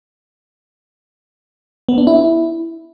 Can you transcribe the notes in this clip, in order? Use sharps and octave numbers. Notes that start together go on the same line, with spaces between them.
B3
D4
E4